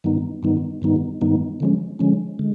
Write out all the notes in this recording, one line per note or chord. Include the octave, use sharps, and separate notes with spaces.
G2 D#3 G3 B3 D#4
G2 D#3 G3 B3 D#4
G2 D#3 G3 B3 D#4
G2 D#3 G3 B3 D#4
D3 F3 G#3 C#4
D3 F3 G#3 C#4
D3 G#3